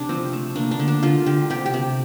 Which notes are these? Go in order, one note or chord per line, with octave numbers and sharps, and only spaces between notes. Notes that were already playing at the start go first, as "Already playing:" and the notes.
Already playing: C3 D4
F3 C4
A3
A#3 D4
D4
D3
D4
D3 F4
D3 G4
C3 G4
G4
C3